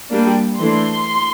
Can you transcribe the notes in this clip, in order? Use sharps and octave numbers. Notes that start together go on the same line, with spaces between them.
G3 A#3 D4
E3 A3 D4 C6